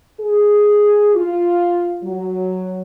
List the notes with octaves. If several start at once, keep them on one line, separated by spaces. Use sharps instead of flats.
G#4
F4
F#3